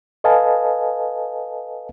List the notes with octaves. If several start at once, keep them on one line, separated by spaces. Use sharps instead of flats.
A4 B4 D#5 F5 G#5 A5